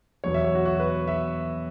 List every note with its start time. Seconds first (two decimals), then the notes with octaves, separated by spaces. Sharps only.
0.24 E2 B2 F#3 B3 C#5
0.34 E5
0.44 C#5
0.55 F#4
0.65 F#4
0.80 B4
1.07 E5